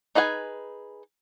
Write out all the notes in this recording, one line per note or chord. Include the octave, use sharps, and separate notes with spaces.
D#4 G#4 B4 F5 G#5